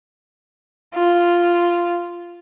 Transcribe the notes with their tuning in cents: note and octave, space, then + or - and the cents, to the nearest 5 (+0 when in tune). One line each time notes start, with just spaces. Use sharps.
F4 -5